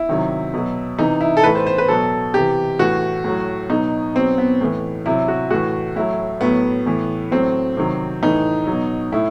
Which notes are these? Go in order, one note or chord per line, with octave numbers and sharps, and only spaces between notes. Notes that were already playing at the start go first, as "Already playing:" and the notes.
Already playing: E4
C3 D#3 F#3
B2 F#3
C3 E3 D#4
E4
A4
A2 E3 B4
C5
C5
B4
B2 F#3 A4
C3 E3 G4
A2 E3 F#4
A2 F#3
B2 F#3 D#4
B2 F#3 C4
B3
A2 E3
C3 F#3 E4
F#4
A2 E3 F#4
A2 F#3 E4
A2 F#3 B3
A2 E3
A2 F#3 C4
C3 D#3 F#3
A2 E3 D#4
B2 F#3
A2 E4